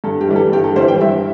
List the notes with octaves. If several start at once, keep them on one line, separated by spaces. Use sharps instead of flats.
G2 A4
G4
E3 G3
A4
G2 G4
A4
E3 G3 C5
G5
G2 E5